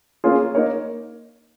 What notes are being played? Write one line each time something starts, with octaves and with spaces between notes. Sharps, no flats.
A#3 C#4 F4 G#4
A#3 D#4 A#4 C#5